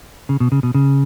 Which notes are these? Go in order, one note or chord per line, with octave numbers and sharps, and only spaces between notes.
C#3
B2
C#3
B2
C#3